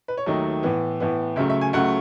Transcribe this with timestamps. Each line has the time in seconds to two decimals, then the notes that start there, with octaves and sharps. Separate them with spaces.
0.08 B4
0.17 C#5
0.26 D#2 D#3 F#3 A3 D#5
0.63 A2 E3 B3
1.00 A2 E3 B3
1.36 C#2 C#3 F#3 A3 E5
1.50 E5
1.61 G#5
1.73 C#2 C#3 F#3 A3 F#5